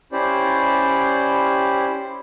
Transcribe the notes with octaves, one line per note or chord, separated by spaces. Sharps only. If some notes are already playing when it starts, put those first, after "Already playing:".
C#4 E4 G4 C5 D5